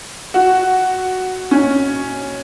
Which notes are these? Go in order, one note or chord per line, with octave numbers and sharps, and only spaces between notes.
F#4
C#4